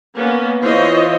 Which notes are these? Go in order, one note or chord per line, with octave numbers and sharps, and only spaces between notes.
A#3 B3 C#4
E3 F4 C5 C#5 D#5